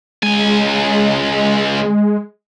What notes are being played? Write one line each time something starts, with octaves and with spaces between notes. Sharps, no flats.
C#2 G#3 G#5